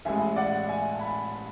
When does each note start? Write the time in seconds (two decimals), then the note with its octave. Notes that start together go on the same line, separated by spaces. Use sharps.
0.05 A1 A2 G#3 E5 G#5
0.36 D5 F#5
0.68 E5 G#5
0.93 A5
0.99 G#5 B5